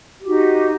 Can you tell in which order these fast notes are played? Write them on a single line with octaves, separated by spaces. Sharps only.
G4 F#4 D#4 B4